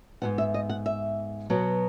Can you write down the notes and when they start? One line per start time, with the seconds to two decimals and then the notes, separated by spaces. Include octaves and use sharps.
0.22 G#2 E3 B3 F#5
0.38 E5
0.54 D#5
0.69 F#5
0.86 E5
1.50 B2 F#3 B3